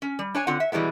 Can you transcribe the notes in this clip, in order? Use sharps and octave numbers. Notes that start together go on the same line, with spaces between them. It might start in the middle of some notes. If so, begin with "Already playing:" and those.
C#4
G3
D4 C#5 G#5
D3 C4 F4 F#5
E5
B2 E3 G3 G#3 B3